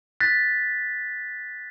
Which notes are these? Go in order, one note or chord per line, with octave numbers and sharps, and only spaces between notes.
F#6 A6 B6